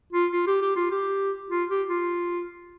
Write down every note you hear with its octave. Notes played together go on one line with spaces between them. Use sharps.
F4
F4
G4
G4
F4
G4
F4
G4
F4